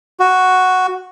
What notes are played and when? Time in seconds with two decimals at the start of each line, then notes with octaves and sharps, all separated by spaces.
0.20 F#4